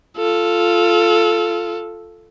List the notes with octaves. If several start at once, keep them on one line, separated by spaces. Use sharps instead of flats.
F4 A4